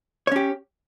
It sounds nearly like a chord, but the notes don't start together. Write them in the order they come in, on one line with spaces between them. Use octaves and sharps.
C#5 C#4 G4